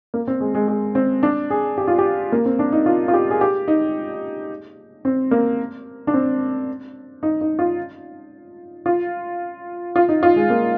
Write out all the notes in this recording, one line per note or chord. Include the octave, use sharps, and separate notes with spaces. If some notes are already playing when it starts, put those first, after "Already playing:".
A#3
C4
G#3
G#3
G#3
C4
D4
G#4
G4
F4
G4
A#3
C4
D4
D#4
F4
F4
G4
G#4
G4
D#4
C4
A#3
D4
C4
D#4
D#4
F4
F4
F4
D#4
F4
G#3
A#3